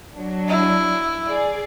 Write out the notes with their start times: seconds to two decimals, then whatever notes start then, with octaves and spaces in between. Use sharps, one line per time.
0.15 F#3 D4
0.48 E4
1.29 G#4 D5